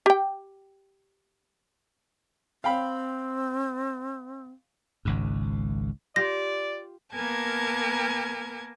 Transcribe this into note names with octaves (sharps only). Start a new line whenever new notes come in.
G4 G5
C4 F5 G5 B5
G#1 C#2 G#2
F4 G4 D5 A#6
A#3 B3 A#4 G#5 A5 G#6